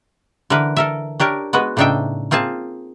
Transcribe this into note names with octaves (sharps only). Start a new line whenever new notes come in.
D3 E3 A#4 B4
A4 A#4 E5
D4 G4 A#4 C#5
G#3 B3 F#4 B4
A2 C#3 D4 D#4 E5 G5
A#3 C4 F4 G#4 A5